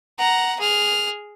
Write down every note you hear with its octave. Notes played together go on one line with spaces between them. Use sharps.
F#5 A#5
G#4 F6